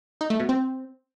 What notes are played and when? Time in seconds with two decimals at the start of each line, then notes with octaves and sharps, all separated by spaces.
0.21 D#4
0.30 A3
0.40 B2
0.49 C4